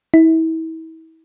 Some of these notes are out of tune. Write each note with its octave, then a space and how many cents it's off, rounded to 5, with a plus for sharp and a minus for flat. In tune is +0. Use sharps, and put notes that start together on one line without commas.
E4 -35